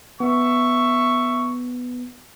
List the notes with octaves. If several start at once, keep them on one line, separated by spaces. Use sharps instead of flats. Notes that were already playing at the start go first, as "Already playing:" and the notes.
B3 E5 C#6